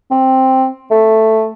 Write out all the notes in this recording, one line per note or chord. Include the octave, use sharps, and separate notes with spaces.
C4
A3